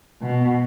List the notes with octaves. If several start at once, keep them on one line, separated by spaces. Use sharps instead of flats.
B2